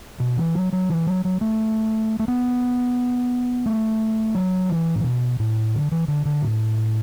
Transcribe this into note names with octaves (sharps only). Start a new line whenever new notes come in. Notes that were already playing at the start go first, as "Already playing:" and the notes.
B2
E3
F#3
F#3
E3
F#3
F#3
A3
A3
B3
A3
F#3
E3
A2
B2
A2
D3
E3
D3
D3
A2